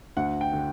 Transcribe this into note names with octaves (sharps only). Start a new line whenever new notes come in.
D2 F#5
G5
D3